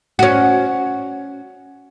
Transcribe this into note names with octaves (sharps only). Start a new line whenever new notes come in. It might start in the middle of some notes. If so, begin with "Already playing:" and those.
C#4 F#4